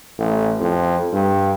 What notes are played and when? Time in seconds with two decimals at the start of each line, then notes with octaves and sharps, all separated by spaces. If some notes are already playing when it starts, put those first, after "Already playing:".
0.19 A1
0.60 F2
1.13 G2